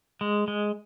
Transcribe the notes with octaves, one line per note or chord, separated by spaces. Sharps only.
G#3
G#3